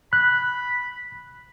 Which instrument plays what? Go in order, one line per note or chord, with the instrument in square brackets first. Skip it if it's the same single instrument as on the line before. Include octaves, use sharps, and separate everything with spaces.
[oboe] B5 [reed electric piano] F#6